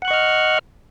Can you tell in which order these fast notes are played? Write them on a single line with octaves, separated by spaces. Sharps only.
F#5 F#6 C#6 D#5 F6